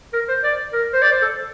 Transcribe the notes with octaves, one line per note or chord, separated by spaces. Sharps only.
A#4
C5
D5
A#4
C5
D5
C5
A4